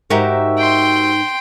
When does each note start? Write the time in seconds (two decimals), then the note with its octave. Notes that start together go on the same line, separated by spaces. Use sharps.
0.10 G#2 D#4 F#4 G4 A#4 E5
0.58 G5 C6